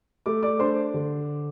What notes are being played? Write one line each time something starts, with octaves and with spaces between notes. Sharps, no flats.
A3 D6
D5 D6
D4 C5 C6
D3